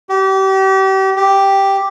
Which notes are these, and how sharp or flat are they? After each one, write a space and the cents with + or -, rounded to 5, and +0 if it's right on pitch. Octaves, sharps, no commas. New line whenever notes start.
G4 -35
G4 +0